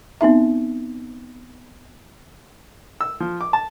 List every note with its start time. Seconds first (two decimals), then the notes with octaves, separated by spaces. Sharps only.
0.21 B3 C4 D#4 E5
3.01 E6
3.20 F3
3.41 D6
3.53 A5